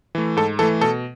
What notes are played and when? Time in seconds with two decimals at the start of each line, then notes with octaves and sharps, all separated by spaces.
0.15 E3 A3
0.37 G#2 A4
0.59 E3 A3 A4
0.81 B2 A4